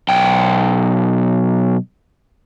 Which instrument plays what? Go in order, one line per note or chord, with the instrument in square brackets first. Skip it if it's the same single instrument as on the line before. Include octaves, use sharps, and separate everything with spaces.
[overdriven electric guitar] B1 G5